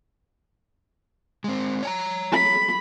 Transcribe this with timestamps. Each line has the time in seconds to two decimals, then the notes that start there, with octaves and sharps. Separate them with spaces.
1.44 G#3 C4
1.83 C#5 G#5 A#5
2.32 B5